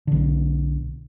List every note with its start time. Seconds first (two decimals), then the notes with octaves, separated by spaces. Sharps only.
0.07 B1 D3